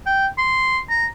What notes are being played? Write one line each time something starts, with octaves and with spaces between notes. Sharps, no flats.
G5
C6
A#5